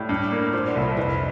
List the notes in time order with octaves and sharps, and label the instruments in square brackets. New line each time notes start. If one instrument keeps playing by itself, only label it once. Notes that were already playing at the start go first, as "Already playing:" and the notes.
Already playing: [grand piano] A2 [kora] G3
[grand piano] G2
A#3
[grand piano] A#2 [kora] F3
[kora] D3
[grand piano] C2
[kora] F3
[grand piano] F2 [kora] E3